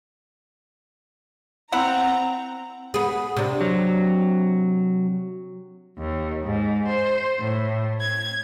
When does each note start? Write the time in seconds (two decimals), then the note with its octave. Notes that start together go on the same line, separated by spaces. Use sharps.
1.72 C4 E4 F#5 A#5
2.94 B3 G#4
3.37 C3 D4
3.61 F#3
5.97 D#2
6.43 G#2
6.86 C5
7.39 A2
8.00 G#6